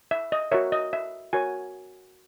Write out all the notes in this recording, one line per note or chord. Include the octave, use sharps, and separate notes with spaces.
E5
D#5
F#4 A#4 C#5 E5
D#5
E5
F#4 A#4 C#5 G#5